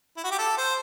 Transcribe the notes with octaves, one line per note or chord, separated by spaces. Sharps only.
E4
F#4
G4
A4
C5